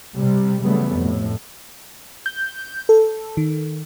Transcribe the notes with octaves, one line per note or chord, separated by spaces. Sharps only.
C3 G3
C#3 E3 F#3 G3 A3 B3
F2 A2
G6
A4
D#3